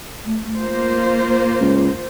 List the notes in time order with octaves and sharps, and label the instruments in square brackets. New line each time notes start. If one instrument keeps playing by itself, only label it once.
[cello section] A3
A#3 F4 C5
[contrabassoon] C#2